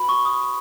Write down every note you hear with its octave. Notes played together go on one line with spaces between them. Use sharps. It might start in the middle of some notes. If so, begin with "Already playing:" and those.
Already playing: F#4 B4 B5
C#6
D#6